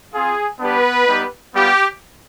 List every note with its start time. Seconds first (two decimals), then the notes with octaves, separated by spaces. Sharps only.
0.13 C4 F4 G#4
0.60 G3 B3 D4 G4 B4
1.07 G3 B3 D#4 G4
1.53 G3 B3 F4 G4